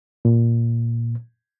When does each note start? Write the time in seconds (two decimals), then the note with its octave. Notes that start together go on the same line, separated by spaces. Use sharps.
0.25 A#2